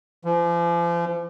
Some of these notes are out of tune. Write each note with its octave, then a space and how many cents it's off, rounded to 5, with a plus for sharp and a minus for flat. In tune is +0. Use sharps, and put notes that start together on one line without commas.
F3 -40